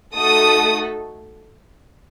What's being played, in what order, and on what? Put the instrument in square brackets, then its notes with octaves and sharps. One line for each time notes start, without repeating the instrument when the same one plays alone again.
[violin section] A3 D#4 F#4 A4 D#6